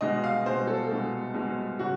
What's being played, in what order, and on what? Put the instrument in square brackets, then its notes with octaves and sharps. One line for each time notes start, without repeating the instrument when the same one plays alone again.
[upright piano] C2 B2 G#3 D#5
F5
C2 B2 G#3 C5
A4
C2 B2 G#3
C2 B2 G#3
C#3 F#4